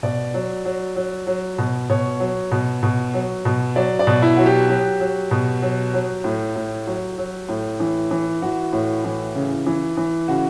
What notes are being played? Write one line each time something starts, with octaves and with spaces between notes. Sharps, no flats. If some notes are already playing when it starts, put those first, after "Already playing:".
B2 D5
F#3
F#3
F#3
F#3
B2
B2 C#5
F#3
B2
B2
F#3
B2
F#3 D5
D5
B2
E4
F#3 F#4
G4
F#3 G4
F#3
B2
F#3
F#3
A2
A2
F#3
F#3
A2
E3
E3
E3 F#4
A2
E3
C#3
E3
E3
C#3 F#4